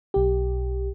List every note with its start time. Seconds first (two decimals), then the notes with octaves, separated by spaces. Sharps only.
0.14 B1 G4